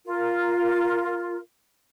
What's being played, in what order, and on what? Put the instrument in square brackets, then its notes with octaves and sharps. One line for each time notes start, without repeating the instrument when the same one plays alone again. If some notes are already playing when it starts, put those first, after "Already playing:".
[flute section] F4 A#4